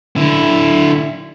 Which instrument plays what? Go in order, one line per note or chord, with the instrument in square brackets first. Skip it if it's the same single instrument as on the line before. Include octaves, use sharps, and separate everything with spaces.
[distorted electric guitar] D3 E4